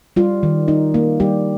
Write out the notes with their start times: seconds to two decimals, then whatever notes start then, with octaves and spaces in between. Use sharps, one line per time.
0.16 G3 F4
0.43 D#3
0.68 D#4
0.94 A#3
1.20 G3 G4